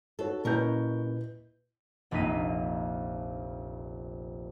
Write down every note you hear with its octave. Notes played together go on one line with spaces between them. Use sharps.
D#4 F#4 A4 C#5
A#2 C#4 E4 A#4 B4 D#5 G6
F1 A#1 A#3 D#4 B6 D#7